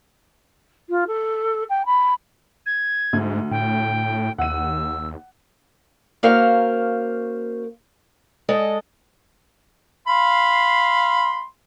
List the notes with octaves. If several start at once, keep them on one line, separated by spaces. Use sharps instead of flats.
F4
A4
G5
B5
G#6
D2 G#2
A2 G5
D#2 F#5 E6 D#7
A#3 C#4 F#4 A#4 C5 F5
G#3 A4 D#5
F5 B5 C6